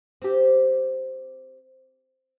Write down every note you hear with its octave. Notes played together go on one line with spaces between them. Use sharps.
C4 G4